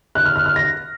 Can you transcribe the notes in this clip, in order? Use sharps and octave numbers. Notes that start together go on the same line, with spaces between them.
F#6
F6
F6
F6
A#6